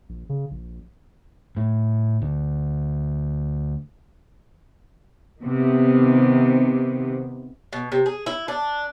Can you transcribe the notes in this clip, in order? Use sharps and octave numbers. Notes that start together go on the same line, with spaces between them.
A#1
C#3
A#1
A2
D2
C3 D#3 B3
B2
C3
G#4
E4
D4